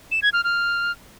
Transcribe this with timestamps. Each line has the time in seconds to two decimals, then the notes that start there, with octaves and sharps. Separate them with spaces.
0.11 E7
0.22 G#6
0.33 F6
0.44 F6